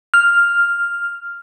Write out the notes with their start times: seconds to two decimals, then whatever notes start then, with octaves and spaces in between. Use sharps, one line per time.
0.14 F6